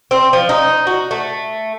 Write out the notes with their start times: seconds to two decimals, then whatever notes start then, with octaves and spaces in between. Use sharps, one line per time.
0.11 C4
0.33 F3
0.49 D#4
0.87 F#4
1.11 A3